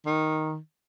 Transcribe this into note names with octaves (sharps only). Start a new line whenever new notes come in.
D#3